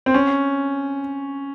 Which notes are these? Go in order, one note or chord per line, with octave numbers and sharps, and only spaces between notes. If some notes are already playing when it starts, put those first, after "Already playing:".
C4
C#4